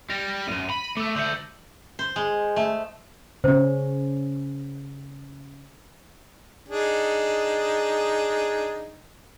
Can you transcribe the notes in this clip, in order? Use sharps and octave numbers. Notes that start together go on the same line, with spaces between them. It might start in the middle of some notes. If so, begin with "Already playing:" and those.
G3 A#6 D7
A#6
C#2 F#2 D#7
B5
A3 D6 E6
D3 A3 E6 G6 F#7
C5
G#3
A3
C#3 C#4 C5
D4 D#4 G#4